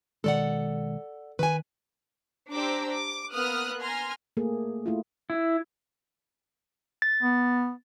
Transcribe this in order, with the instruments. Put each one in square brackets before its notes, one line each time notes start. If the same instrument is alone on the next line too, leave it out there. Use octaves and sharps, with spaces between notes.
[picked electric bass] B2 D#3 G#3 [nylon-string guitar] A4 D5 F#5
[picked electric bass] D#3 [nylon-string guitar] B4 G#5
[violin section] D4 G4 C5 A#5 D6 E6
D6
A#3 B3 D#6 F6 F#6
G#5 A#5 C6 F6
[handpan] A3 A#3 G#4
A3 E4 F4
[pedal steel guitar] E4
[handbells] A6
[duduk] B3